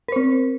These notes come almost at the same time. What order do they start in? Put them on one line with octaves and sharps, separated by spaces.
A#4 C5 C4